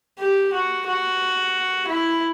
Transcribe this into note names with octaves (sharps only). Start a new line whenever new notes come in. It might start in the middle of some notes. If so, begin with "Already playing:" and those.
G4
F#4
F#4
E4